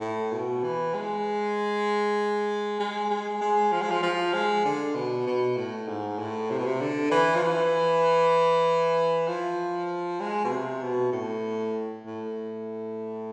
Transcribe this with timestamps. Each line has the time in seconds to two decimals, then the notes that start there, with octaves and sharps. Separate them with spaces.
0.01 A2
0.32 B2
0.64 E3
0.94 G#3
2.80 G#3
3.10 G#3
3.41 G#3
3.72 F3
3.81 G#3
3.91 F3
4.03 F3
4.34 G#3
4.65 D3
4.95 B2
5.27 B2
5.57 A2
5.88 G#2
6.19 A2
6.50 C3
6.58 B2
6.66 C3
6.81 D3
7.11 E3
7.36 F3
7.43 E3
9.28 F3
10.20 G#3
10.44 B2
10.51 C3
10.82 B2
11.12 A2
12.06 A2